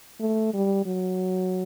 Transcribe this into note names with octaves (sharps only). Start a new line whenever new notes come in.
A3
G3
F#3